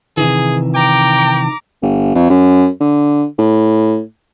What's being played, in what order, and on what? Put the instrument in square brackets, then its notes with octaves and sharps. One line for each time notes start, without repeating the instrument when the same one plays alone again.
[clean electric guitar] C3 D#3 E3 [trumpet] G#4
[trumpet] G5 [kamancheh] A#5 D6
[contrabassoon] G1
F2
F#2
D3
A2